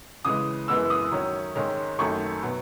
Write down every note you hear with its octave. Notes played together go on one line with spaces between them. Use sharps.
C#3 E3 G#3 D#6
F#2 E3 G#3 B3 E6
D#6
D#3 F#3 C#4
G#2 D#3 G#3 C#4
F#2 D#3 F#3 A3 D#4 C#6
B2 F#3 B3